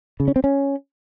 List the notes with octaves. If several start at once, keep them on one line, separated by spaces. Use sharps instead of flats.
C#3
C#4
C4
C#4